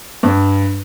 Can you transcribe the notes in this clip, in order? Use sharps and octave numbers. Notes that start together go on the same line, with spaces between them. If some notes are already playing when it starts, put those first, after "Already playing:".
G2